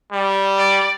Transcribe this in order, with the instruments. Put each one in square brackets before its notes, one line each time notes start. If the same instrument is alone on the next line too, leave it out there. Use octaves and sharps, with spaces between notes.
[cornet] G3
[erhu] D5